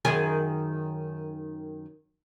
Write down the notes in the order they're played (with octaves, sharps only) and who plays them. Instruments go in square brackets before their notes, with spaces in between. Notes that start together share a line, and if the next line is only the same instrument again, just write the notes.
[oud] F#2 D#3 G#4